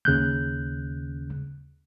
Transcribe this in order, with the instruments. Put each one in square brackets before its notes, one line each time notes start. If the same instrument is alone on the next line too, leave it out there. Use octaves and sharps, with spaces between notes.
[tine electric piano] D#2 C#3 F#6 G6